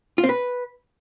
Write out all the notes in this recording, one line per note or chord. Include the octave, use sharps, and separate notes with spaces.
F4
C4
B4